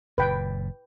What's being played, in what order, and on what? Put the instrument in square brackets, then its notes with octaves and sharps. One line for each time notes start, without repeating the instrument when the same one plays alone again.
[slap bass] F#1 A#2 [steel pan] B4 G5